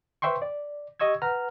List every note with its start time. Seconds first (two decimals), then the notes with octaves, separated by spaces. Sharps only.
0.22 B4 C5 E5 G5 C6 C#6
0.42 D5
1.00 G4 D#5 C#6 E6 G#6
1.22 B4 F#5 A#5 F6